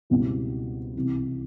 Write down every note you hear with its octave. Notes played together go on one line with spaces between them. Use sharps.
C#2 B2 G3 C4 E4
C2 C3 E3